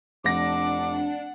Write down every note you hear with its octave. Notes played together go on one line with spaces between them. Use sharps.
F1 D4 F#5 D6 A#6